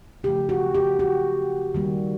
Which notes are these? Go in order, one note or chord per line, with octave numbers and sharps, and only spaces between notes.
C#3 F3 A3 G4
F#4
G4
F#4
D#3 G3 A#3